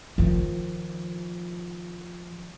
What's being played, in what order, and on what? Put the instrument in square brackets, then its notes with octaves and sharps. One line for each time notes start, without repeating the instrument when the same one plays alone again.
[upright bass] D#3 F3